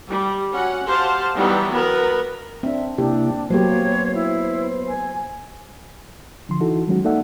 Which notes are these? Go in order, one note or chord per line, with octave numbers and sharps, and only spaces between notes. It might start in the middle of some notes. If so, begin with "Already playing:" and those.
G3
C#4 F#4 F#5
G4 C5 F5 F#5 A5
E3 F#3 G3 B3 D#4 G5
B3 F#4 A#4 B4
C4 D4 E5
C3 A#3 D4 E4 G4
F#3 A#3 B3 G4 C5 C#5
E4
G#5
D3 F3 C6
E3 D#4 E4 F#4 A4
D#3 F#3 G#3 C#4 F#4
A#3 D#4 A4 D5 E5 F#5